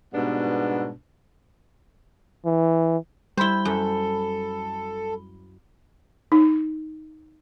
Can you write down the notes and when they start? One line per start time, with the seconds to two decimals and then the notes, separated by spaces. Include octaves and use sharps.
0.14 G#2 B2 G3 B3 D4
2.46 E3
3.37 G3 E4 C5 B5 G7
3.65 F#2 A4
6.32 D#4